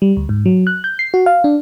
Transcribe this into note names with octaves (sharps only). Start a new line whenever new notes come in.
G3
D2
G#2
F#3
F#6
G6
C7
F#4
F5
D4